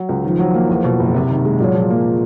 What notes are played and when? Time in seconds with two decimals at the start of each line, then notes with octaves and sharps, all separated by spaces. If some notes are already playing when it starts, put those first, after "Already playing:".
Already playing: F#3
0.09 C#2
0.24 D#3 F3
0.39 F#3
0.54 A#3
0.69 E2
0.84 B2
1.00 F#1
1.14 C3
1.30 D#3
1.45 G#3
1.60 A#2 F#3
1.75 F3
1.90 A#3